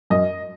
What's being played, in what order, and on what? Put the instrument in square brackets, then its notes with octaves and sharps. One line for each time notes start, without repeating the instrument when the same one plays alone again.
[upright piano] F#2 D#5